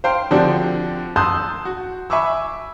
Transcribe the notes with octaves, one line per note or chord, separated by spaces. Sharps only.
C5 F5 G5 C6
D3 F3 C4 D4 F#4 G4
A5 C6 D#6 E6 F#6 G6
F#4
E5 G#5 B5 C#6 D6 E6